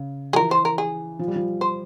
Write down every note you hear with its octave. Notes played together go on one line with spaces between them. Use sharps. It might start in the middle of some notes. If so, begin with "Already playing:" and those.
Already playing: C#3
F3 G#4
E3 A#4
C5
A#4
G#4
F3
G3
F3
C5